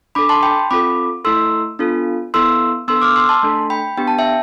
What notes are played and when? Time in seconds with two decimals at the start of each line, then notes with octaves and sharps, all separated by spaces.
0.15 D4 A4 B5 D6
0.29 A5 C6
0.43 G5 B5
0.71 C4 F4 A4 B5 D6
1.25 A3 E4 A4 C6 E6
1.79 B3 D4 F4 A4
2.34 B3 E4 A4 C6 E6
2.88 B3 D4 A4 C6 E6
3.02 D6 F6
3.15 C6 E6
3.29 A5 C6
3.43 A3 D4 A4
3.70 G5 B5
3.97 B3 D4 G4 G5
4.08 A5
4.19 E5 G5